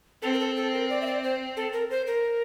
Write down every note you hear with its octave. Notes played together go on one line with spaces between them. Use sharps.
C4 A4
A#4
A4
A4
A#4
D5
E5
D5
C5
A4
A#4
C5
A#4